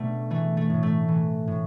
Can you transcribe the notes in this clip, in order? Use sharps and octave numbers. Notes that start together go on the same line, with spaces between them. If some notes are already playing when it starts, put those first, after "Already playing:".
Already playing: B2 A3 D4
E3 A3
A3
A2
A3
E3
A2